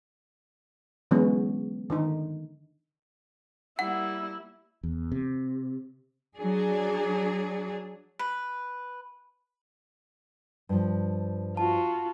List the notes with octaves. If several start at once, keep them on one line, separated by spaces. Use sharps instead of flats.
D3 E3 F#3 G#3 B3 C#4
D3 D#3 D#4
G3 A#3 E4 F#5
E2
C3
F#3 D4 G#4
B4
G2 F3
F4 F#4 A5